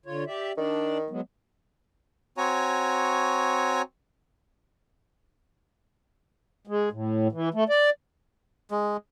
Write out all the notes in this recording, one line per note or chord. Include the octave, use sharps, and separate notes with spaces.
D3 F4 C#5
G4 D5 E5
D#3 D4 D5
F#3 G#3 B3
C4 F#4 C#5 G#5 A#5
G#3
A2
E3
A3
D5
G#3